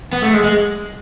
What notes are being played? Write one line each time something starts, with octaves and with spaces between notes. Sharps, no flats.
B3
A3
G#3
G#3